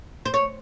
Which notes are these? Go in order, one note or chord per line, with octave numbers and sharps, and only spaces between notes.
C5
C#5